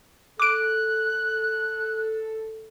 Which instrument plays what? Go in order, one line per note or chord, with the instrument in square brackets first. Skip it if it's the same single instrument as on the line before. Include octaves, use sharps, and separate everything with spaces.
[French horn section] A4 [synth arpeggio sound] D6 D7 [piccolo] F#6